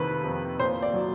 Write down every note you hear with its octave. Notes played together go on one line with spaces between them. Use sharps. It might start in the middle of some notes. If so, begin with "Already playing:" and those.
Already playing: F2 C3 D#3 B4
F2
A#2 C5
D5
F#3